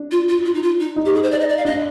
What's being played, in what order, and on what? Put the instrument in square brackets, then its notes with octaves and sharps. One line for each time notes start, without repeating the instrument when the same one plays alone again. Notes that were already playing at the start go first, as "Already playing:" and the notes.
Already playing: [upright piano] D4
[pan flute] F4
F4
F4
D#4
F4
D#4
[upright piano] D#4
[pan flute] G4
G#4
C5
D5
D#5
D5
F5
[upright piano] D4 [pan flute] D#5